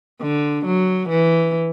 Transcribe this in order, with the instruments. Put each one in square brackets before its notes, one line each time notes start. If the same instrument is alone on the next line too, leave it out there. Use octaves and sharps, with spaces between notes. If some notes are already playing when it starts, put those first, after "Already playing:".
[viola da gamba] D3
F#3
E3